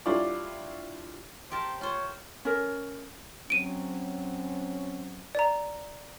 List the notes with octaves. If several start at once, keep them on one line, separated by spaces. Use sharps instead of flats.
G3 D4 E4 F4 C#5 D5
G4 A#4 C5 A5
F4 C5 C#5
C#4 A#4
F#3 C4 C#4 D7 D#7
D5 A#5